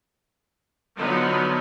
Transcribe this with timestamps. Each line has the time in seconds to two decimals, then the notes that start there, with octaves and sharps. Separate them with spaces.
0.96 D3 F3 F#3 B3 D#4